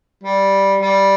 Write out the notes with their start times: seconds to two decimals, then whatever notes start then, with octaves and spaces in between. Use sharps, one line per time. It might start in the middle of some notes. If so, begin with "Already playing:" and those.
0.23 G3
0.81 G3